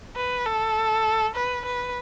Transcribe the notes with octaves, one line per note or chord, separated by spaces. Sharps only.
B4
A4
B4
B4